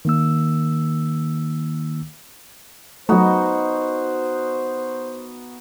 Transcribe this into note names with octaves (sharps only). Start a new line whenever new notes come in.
D#3 A#3 E6
F#3 A3 B3 D#4 F#4 C5